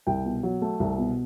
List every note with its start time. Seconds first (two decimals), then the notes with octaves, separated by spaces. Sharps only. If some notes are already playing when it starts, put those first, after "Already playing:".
0.07 C2 G5
0.26 B2
0.43 F#3
0.62 A3
0.80 C2
0.98 B2